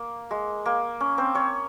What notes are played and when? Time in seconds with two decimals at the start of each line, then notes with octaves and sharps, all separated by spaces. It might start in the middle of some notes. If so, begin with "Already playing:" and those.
Already playing: A#3
0.31 G#3
0.66 A#3
1.00 C#4
1.18 C4 C5
1.35 C#4 C#5